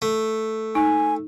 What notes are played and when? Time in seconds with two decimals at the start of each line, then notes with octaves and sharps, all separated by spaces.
0.02 A3
0.75 D#4 G#5